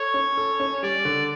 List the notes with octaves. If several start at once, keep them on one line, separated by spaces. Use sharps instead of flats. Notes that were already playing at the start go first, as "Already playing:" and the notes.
Already playing: A4 C#5
C#4
A4
C#4
G3 D5
D3